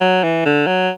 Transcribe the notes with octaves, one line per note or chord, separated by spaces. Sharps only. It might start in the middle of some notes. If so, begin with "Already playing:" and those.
F#3
E3
D3
F#3